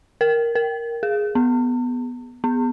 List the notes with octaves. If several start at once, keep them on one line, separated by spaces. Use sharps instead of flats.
A#4
A#4
G#4
B3
B3